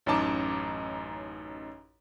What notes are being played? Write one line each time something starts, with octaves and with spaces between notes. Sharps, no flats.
A1 F#2 C#4 D#4 A5 D6